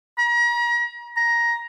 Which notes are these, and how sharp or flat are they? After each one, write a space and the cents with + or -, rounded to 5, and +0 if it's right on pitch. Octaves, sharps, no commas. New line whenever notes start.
A#5 +40
A#5 +15